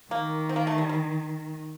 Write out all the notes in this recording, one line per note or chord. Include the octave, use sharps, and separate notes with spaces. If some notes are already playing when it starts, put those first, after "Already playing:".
D#3 A#3
C4
A#3
A3
G3
G3